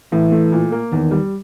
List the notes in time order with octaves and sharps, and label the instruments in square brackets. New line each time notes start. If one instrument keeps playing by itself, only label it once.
[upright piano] A2 [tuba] E3
[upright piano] A3
A#2
A#3
[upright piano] E2 [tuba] D#3
[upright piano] G3